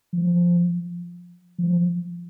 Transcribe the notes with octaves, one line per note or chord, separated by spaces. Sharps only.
F3
F3